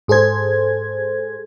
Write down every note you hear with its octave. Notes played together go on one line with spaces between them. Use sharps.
G#2 G#4 A4 C5 G#6